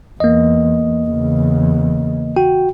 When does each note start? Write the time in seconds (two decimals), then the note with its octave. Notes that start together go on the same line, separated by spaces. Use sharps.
0.20 E2 A#3 D#5
1.08 E2 C#3
2.36 F#4 G5